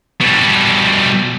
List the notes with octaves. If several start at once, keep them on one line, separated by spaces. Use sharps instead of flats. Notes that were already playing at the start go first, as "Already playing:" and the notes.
B2 G3